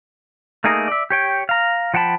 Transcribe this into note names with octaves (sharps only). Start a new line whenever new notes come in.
A3 A#3 D#4 G#4 A#4
D5 E5
G4 C#5 G5
F5 A#5
F3 F#5 G5 A5 B5